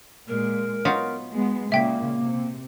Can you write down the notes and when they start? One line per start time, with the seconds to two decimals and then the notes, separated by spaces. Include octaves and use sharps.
0.28 A#2 G#3 A#4
0.85 F#3 B3 D#4 F4
1.33 G#3 B3
1.72 A#2 C#3 A#3 E5 G5 B6
2.19 C3